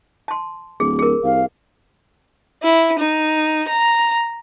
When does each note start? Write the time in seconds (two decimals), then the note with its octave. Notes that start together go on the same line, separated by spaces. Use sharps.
0.28 A5 C6
0.80 D1 G#4
0.99 G#4 A#4
1.24 C2 F5
2.63 E4
2.99 D#4
3.69 A#5